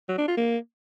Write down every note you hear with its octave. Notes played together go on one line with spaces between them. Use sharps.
F#3
D4
F4
A#3